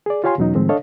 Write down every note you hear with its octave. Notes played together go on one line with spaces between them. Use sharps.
G#4 D5
F4 G4 C#5 F5 G#5 C6
E2 B2 F#3 C#4 D#4
A2 D#3 F3 G#3 C4
D4 A4 C#5 D#5 F5